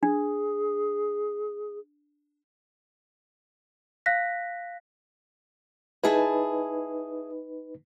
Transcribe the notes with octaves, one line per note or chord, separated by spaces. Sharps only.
D4 G#4
F5 F#6 A#6 B6
D#4 E4 G#4 B4 A5